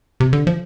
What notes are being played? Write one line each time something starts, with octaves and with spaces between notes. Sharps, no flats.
C3
D3
F3